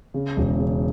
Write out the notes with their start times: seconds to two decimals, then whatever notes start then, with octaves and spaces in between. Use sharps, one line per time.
0.14 C#3
0.37 E1
0.59 C#3